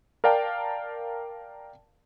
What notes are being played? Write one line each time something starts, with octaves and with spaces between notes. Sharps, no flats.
A#4 D5 F5 G5 A5